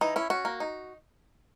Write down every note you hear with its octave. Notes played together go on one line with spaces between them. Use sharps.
E3 D#4
C#4 E4
C#4 F#4
A#3
D#4